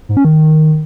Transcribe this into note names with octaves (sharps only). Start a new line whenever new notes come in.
G#2
C#4
D#3